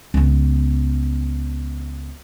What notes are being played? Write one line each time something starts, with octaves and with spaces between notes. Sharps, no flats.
C#2 B3